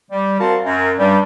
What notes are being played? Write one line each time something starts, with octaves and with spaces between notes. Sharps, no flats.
G3
C4 F#4 A#4 F5 A5
F#2
G2 G3